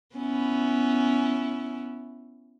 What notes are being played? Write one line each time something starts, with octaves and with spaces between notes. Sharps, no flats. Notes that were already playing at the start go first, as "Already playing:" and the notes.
B3 C#4 E4